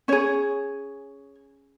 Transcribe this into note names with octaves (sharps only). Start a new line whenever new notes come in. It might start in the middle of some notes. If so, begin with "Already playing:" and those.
C#4 G#4 C#5